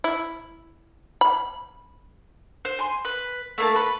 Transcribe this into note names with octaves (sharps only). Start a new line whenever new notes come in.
E4
B5
C5
G#5 C6
B4
A3 A#3 A5
B4